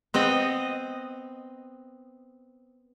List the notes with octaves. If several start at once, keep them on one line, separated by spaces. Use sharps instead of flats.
B3 C4 D#5